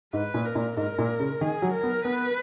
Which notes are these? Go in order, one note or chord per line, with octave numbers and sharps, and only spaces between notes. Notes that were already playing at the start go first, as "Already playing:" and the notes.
G#2 B4
A#2
A#4
A#2
G#2 A#4
A#2
C#3
D#3 G#4
F#3
A#4
B3
B3 B4